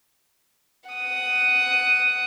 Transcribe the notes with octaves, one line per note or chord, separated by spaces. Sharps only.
F#5 D#6